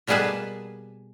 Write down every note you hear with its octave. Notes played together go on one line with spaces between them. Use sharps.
B2 G3 A#3 G#4 B4 A5